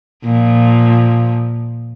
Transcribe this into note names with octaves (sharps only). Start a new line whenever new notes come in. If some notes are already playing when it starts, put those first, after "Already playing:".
A#2 F3